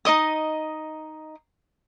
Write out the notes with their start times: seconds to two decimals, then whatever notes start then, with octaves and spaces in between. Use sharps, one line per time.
0.05 D#4 C#5 D#5 D#6